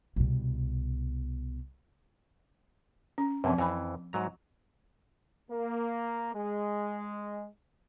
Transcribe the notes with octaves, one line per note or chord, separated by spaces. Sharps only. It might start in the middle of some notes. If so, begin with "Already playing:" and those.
C2 B2
C#4
F#2 C3 F3 C4 B4
F2 E3 G#5 B5
G#2 F#3 A#5
A#3
G#3